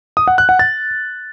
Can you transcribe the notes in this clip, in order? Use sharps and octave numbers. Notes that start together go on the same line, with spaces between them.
D#6
F#5
F#6
F#5
A6